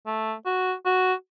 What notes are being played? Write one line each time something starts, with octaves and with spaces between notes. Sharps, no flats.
A3
F#4
F#4